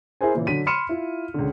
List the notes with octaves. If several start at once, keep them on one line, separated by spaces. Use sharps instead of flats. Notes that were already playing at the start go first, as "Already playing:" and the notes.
E4 G#4 A#4 C5 G#5
A#2 C#3 E3
D3 F#3 B6 D#7
B5 C6 F6 C#7 D#7 E7
E4 F4
C#2 D3